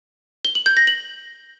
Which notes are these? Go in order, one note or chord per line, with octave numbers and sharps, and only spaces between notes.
G7
F#7
G6
A#6
F#7